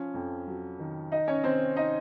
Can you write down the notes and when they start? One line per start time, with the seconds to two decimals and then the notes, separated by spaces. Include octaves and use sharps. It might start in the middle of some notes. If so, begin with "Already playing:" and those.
Already playing: F3 C#4
0.14 F2
0.47 F#3
0.79 D#3
1.12 D#4 D#5
1.28 C#4 C#5
1.43 D#3 C4 C5
1.76 C4 D#4 D#5